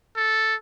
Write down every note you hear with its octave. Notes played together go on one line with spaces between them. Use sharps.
A4